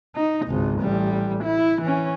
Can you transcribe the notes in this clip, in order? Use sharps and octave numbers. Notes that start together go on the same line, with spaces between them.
D#4
G#1 C#2
A1 G3
E4
E3 C#4